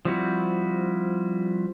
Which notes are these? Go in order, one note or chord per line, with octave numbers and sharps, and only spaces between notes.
F3 G3 C4 E4 F#4